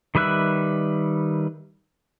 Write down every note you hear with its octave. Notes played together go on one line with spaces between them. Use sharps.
D#3 G3 B4 E5 F#6